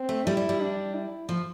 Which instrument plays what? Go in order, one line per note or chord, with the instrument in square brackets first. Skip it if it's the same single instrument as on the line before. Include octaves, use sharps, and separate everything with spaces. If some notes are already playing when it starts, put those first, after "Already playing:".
Already playing: [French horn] C4
[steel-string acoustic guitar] A3
[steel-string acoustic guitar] G3 [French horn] E4
[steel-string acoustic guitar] G3
G3
[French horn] D4
E4
[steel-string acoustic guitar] F3